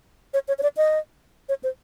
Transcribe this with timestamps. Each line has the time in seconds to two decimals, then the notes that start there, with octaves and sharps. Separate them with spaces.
0.34 C#5
0.48 C#5
0.59 C#5
0.63 D5
0.77 D#5
1.49 C#5
1.63 C5